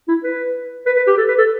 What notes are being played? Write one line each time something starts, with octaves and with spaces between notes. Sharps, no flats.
E4
B4
B4
B4
G4
A4
B4
A4